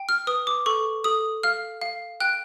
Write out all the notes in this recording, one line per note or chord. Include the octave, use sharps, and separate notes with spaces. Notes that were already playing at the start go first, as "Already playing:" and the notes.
Already playing: G5
F6
B4 D#6
D6
A4 C#6
A4 D#6
F5 F6
F5
G5 F#6